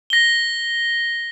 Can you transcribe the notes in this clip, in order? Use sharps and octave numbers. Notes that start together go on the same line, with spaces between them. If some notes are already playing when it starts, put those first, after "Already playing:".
A#6 G7